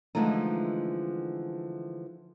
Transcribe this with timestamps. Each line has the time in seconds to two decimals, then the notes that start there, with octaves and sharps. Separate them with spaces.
0.15 D3 E3 F3 G#3 A3 D#4